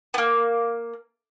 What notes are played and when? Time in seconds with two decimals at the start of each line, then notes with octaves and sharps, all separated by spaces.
0.14 A#3 B3